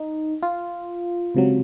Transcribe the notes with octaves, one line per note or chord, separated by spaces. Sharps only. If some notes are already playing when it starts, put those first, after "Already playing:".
Already playing: D#4
F4
C#2 C3 F#3